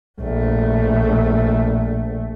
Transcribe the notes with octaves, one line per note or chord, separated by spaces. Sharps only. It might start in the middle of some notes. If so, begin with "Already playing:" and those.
A#1 A3